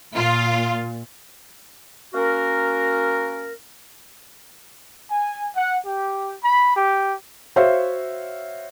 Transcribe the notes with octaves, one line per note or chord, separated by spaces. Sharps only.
A#2 F4
A#3 C#4 F#4 A#4
G#5
F#5
G4
B5
G4
F#4 C5 C#5 E5 F5